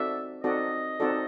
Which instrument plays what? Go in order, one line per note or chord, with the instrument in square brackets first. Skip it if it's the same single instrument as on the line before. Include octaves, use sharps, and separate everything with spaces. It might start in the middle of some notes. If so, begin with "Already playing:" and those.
Already playing: [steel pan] C4 D#4 F#4 A4 D5 [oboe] E5
[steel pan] C4 D#4 F#4 A4 D5 [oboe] D#5
[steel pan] C4 D#4 F#4 A4 D5